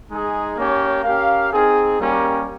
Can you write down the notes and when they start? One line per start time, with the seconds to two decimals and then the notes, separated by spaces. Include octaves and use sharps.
0.09 G#3 D#4 G#4
0.57 A#3 C#4 G4 C#5
1.03 C#4 G4 A#4 F5
1.51 C4 D#4 G#4
1.99 G3 A#3 C#4 G4 A#4